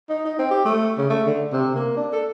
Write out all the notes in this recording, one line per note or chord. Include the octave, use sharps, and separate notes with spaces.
D#4
D#4
C4
G4
A3
C#3
A3
D3
C3
A#3
D4
A4